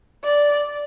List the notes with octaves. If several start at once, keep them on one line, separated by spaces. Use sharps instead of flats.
D5